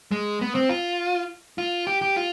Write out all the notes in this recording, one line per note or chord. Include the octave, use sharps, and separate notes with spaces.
G#3
B3
C4
F4
F4
G4
G4
F4